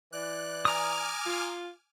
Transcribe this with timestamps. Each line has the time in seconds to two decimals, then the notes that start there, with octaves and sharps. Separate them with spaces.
0.12 E3 D5 F#6
0.65 G#5 A#5 D6 D#6 F6
1.26 F4